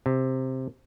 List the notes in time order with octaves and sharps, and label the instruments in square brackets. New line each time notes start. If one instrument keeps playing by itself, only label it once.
[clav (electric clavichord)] C3